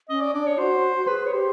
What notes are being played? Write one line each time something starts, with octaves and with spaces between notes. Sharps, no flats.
C#4 D#5
D5
D4 D5
C#5
F#4 C5
G#4 B4
C#5
G4 C5